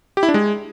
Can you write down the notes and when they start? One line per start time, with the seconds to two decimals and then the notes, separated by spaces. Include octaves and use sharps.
0.17 G4
0.23 E4
0.29 D4
0.34 G#3